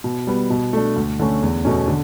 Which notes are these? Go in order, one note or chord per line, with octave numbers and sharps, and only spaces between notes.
B2
G3 B3
B2
A3 D4
D2
D3 A3 C#4
E2
B2 A3 C#4
D3